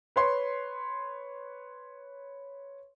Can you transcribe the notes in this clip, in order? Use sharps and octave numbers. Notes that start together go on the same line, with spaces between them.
B4 C#5 C6